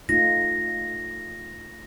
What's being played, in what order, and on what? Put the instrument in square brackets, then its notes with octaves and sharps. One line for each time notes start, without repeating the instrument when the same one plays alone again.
[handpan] A3 D#4 F4 [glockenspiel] A#6